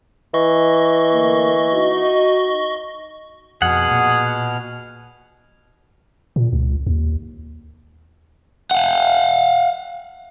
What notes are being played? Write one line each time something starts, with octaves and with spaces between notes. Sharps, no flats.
E3 D#5 C#6
D2 A#3
D#4 F#4
F2 B2 G#4 F#5 F6
A#2
A#2
C#2
D#2
F5 F#5